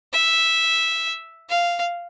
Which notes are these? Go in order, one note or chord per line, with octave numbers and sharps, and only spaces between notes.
E5
F5